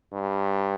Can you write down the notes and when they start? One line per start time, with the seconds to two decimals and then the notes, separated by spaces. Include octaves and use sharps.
0.13 G2